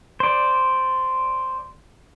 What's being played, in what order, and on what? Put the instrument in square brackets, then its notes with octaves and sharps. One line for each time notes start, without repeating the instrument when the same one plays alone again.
[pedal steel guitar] C5 D5